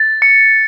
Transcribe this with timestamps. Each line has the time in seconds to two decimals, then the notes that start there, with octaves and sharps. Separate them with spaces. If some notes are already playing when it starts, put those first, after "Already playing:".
Already playing: A6
0.22 C#7